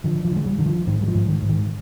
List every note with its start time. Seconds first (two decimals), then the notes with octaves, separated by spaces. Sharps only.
0.04 D3 F3
0.25 F3
0.31 D3 G#3
0.46 G3
0.58 D3 D#3
0.66 F3
0.87 G#2 D#3
1.02 G3
1.07 F3
1.15 G#2
1.28 D#3
1.42 G#2
1.49 D#3